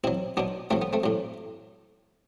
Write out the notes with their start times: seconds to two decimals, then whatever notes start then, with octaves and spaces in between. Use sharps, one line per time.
0.04 B2 F#3 C4 E4
0.37 B2 F#3 B3 D4
0.71 A2 F#3 A3 C4
0.82 B3
0.93 A3 C4
1.04 A2 F#3